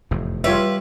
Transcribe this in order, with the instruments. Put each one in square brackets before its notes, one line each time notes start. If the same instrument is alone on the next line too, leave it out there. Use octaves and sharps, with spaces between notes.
[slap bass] F1 E2 A2
[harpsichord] G3 G5 [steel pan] F4 C#5 E5 [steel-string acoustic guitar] B4